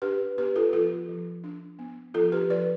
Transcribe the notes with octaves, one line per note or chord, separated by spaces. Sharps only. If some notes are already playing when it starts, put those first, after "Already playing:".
D4 G4 B4
B3 G4 B4
F4 A4
F3 F4 A4
F3
D4
B3
F3 F4 A4
G4 B4
F3 B4 D5